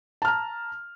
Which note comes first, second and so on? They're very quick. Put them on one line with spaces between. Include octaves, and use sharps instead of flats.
A5 F6 A#5